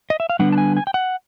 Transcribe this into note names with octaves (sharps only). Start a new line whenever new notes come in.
D#5
E5
F5
D3 G3 B3 D4 F#5
A5
G#5
G#5
G5
F#5